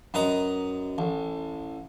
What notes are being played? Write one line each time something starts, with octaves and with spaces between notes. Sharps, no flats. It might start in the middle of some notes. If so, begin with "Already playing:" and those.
F#2 B4 D#5 A#5
A1